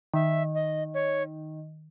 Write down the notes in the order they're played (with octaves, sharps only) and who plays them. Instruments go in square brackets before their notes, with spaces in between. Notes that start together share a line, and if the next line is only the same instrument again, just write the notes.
[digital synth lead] D#3 [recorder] E5
[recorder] D#5
C#5